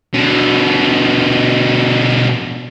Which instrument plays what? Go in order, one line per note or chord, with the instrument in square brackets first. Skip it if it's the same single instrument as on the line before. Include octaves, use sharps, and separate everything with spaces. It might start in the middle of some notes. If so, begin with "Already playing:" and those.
[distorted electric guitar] B2 D3